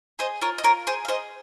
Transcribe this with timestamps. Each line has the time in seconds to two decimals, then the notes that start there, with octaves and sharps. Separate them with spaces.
0.19 G#4 C5 D#5
0.42 F4 A#4 C#5
0.58 D#5
0.64 F4 A#4 C#5
0.87 G#4 C5
1.05 F5
1.08 G#4 C5 D#5